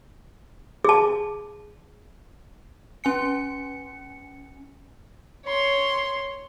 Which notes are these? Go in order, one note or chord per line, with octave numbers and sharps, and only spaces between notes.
G#4 A5
C#4 G#5 C#7
C#5 C6